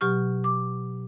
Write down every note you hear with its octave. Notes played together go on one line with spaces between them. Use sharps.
B2 F#3 G4 C#6 F6
D6